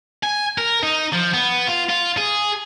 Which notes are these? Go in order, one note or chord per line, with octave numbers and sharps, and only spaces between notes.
G#5
A#4
D#4
F3
B3
F4
F4
G#4